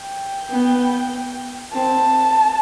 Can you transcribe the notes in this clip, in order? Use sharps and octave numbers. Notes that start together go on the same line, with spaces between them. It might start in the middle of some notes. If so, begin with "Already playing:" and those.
Already playing: G5
B3
C4 A5